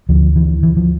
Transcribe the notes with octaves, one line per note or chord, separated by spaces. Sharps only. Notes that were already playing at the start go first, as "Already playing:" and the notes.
D2 D3 F3
E3
E3
F3